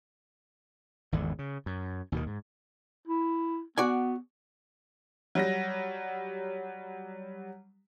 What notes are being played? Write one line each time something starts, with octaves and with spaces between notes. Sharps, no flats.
G#1 E2 D3
C#3
F#2
D#2 B2 D#3
G#2
E4
B3 F#4 D5 G#5
F#3 G3 A#6